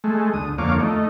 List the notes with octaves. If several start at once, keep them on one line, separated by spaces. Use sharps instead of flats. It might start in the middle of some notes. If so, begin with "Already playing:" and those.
G#3 A3
D2 D#6
F2 D3 A#3 C#5 F5 D6
A3 D#4